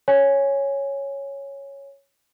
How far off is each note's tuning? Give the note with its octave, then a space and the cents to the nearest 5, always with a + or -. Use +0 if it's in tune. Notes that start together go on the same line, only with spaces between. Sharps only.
C#5 +0 G#5 +0